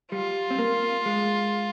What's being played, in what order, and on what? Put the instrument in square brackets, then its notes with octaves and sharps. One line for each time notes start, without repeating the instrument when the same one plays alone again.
[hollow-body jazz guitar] G3 [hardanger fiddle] F4
[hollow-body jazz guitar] C4
A#3
G#3